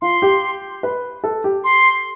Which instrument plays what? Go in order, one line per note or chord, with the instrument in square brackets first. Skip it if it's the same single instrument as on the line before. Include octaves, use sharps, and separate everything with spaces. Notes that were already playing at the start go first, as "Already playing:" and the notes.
[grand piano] F4 [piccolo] C6
[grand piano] G4
B4
A4
G4
[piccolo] C6